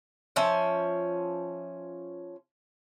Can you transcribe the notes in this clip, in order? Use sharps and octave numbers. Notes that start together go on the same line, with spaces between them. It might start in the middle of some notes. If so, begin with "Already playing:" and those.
F3 C#4 E5